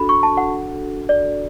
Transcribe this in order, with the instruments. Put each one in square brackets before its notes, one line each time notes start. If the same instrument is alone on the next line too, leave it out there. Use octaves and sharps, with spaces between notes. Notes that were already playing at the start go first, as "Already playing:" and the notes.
Already playing: [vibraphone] D4 F#4 A4 [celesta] B5
[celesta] C#6
A5
F#5
D5